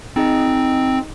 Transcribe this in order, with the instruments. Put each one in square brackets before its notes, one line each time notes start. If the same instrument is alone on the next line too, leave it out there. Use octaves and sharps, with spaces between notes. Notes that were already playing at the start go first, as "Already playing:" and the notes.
[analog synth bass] C4 [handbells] D#4 G#4 D#5